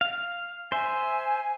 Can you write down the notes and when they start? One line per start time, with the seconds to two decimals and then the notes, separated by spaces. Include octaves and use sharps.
0.01 F5
0.72 C5 E5 G#5